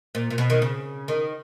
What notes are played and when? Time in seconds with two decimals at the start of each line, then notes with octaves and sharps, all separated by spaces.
0.15 A#2
0.30 A#2
0.38 B2
0.50 D#3
0.62 C#3
1.08 D#3